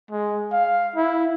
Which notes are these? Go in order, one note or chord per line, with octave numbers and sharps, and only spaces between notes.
G#3
F5
E4